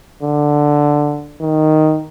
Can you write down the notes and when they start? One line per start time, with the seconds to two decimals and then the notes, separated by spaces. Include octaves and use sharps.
0.22 D3
1.41 D#3